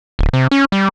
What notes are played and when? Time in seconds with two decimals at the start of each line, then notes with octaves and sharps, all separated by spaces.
0.19 D1
0.33 C3
0.51 C#4
0.72 G3